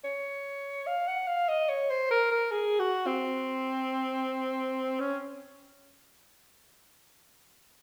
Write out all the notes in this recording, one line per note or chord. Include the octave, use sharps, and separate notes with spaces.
C#5
F5
F#5
F5
D#5
C#5
C5
A#4
A#4
G#4
F#4
C4
C#4